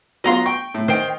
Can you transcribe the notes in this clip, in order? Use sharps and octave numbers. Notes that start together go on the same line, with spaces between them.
F#3 B3 F4 D#5 A#5 C6
G5 C#6
A2
D#3 C5 G5